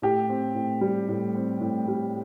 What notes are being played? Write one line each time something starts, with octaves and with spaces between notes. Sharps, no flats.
A2 G4
C4
A2
G3
A2
C4
A2
G3